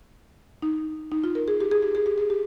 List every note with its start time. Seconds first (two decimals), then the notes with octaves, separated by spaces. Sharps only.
0.62 D#4
1.11 D#4
1.24 F4
1.35 A#4
1.48 G#4
1.60 G4
1.72 G#4
1.83 G4
1.95 G#4
2.06 G4
2.18 G#4
2.30 G4